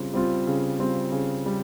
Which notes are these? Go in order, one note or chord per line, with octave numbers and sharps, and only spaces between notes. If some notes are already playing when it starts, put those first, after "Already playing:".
Already playing: C#3 G3 C4 F4
G3 C4 F4
C#3
G3 C4 F4
C#3
G3